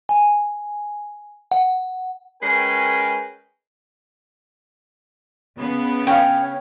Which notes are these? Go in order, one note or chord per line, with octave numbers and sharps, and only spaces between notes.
G#5
F#5
G#3 C#4 A#4 B4 G5
C#3 B3
C#4 C#5 F5 G5